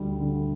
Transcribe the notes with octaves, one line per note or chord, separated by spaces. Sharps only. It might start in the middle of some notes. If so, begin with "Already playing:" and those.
Already playing: D2 G3
D3